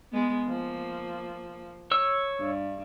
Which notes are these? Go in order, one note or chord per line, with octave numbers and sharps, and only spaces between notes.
G#3 B3
F3 A#3
C#5 E6
G2